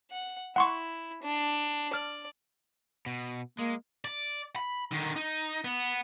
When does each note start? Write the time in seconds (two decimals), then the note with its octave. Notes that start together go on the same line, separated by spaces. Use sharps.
0.11 F#5
0.56 E4 F#5 C6 C#6
1.23 D4
1.94 D5 F6
3.06 B2
3.59 G#3 A#3
4.05 D5
4.56 B5
4.91 D3 D#3
5.16 D#4
5.64 B3